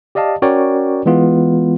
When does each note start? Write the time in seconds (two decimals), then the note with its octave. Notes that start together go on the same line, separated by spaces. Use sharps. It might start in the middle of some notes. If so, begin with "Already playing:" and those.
0.15 G4 D5 D#5 F5 A5
0.42 C#4 F#4 A#4 C#5 D5 G5
1.06 E3 G#3 B3 F4